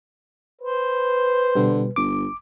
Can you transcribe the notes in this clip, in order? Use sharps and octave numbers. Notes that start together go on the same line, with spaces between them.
B4 C5
B2 D3 G3
G1 D6